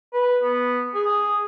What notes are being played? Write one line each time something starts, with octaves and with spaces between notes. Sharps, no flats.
B4
B3
G#4